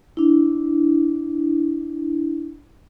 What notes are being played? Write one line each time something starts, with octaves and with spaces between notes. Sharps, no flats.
D4 E4